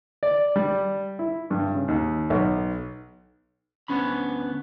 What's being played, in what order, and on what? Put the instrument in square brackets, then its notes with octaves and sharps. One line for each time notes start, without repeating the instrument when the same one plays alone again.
[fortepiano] D5
G3
E4
G2
C#3
D#2
B1
[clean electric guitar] D2 D#3 B3 C#4 D4 B5